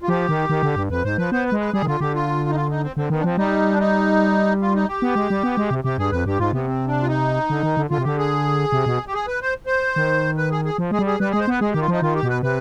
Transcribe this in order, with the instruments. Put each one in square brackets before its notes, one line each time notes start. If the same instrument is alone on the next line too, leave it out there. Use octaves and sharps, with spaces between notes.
[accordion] F4
[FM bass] F3 [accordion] G4
[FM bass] D#3
D#3
D3
G2
[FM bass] F2 [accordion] B4
[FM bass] G#2 [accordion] C5
[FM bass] F3 [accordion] B4
[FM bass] B3 [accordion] C5
[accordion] B4
[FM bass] G#3
[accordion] B4
[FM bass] G3 [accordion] G#4
[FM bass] D#3
[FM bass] D3 [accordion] F4
[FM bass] D3 [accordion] G4
[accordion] F4
D#4
F4
D#4
C4
[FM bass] D3 [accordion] C4
[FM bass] D#3 [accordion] B3
[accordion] D4
[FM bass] F3 [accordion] C4
[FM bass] G3 [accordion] D#4
[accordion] D4
D#4
F4
D#4
G4
[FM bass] B3
G#3
G3
B3
G#3
C3
[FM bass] C3 [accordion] G4
[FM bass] G2 [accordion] G#4
[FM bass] F2 [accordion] B4
[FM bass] G2 [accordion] G4
[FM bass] G#2 [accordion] F4
[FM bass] C3 [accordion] B3
[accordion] C4
D4
F4
D#4
[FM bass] D3
D#3
D3
[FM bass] D3 [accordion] F4
[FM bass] C3
[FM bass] D3 [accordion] G4
[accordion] G#4
[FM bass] C3
B2
[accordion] G4
G#4
B4
C5
C5
[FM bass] D#3
[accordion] B4
G#4
G#4
[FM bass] F3
[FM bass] G#3 [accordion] G#4
[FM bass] G3
[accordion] G#4
[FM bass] G3 [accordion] B4
[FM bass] G#3 [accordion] G#4
[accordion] C5
[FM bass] B3 [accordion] B4
[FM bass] G#3 [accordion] G#4
[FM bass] D#3 [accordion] G4
[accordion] F4
[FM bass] F3 [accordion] D#4
[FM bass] D#3 [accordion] F4
[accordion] G4
[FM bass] B2
[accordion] B4
[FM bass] C3 [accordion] B4